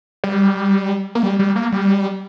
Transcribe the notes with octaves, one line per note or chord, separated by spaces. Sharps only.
G3
A#3
G3
G3
A#3
G3